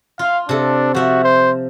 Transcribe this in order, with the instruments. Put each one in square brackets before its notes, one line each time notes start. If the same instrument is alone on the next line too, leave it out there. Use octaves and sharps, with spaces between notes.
[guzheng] F4 [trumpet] F5
[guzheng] C3 A4 [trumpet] D4
[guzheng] F3 E5 [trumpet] F#4
[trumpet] C5